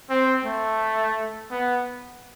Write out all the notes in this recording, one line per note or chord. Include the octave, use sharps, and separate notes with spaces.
C4
A3
B3